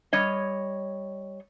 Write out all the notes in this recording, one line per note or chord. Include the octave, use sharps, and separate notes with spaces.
G3 C#5 D#5